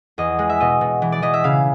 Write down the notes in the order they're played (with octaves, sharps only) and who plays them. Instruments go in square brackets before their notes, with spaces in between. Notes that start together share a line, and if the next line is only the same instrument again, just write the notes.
[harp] E2 D#5
G#3
E5
B2 D#5
B2
E3
D5
E3 D#5
E5
C#3 F5